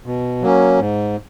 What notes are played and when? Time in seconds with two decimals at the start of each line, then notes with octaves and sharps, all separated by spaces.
0.06 B2
0.42 F#3 A#3 C#4
0.79 G#2